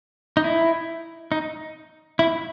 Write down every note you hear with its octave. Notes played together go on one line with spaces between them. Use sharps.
D#4
E4
D#4
E4